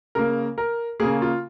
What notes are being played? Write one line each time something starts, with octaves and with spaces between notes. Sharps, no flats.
C#3 A#3 A#4
A#4
C#3 A#3 G#4
F4